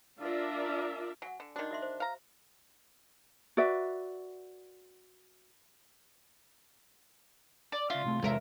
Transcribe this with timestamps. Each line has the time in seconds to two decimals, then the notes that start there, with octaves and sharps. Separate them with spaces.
0.22 D4 F4 A#4 D5 E5
1.22 F#3 F#5 G#5
1.40 D3
1.56 D#3 D4 F#4 C6
1.71 F#4 E5 C6
1.82 C5
2.00 F5 A#5
3.57 F#4 B4 D5 E5
7.72 D5
7.90 C#3 F4 D5 E5
8.04 C2 C3 A3
8.22 E2 C3 G#3 A#4 C#5 E5